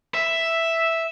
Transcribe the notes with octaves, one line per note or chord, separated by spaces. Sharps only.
E5